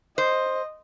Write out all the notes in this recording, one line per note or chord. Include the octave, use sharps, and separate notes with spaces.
C5 D#5